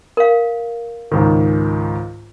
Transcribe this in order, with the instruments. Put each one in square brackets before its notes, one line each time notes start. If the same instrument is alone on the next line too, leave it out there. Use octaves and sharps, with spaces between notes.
[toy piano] A#4 F5
[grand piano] C#2 G#2 D#3